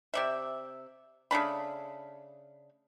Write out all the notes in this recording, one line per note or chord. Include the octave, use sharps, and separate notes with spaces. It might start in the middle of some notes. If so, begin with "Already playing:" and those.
C3 D5 E5
C#3 A3 D4 B5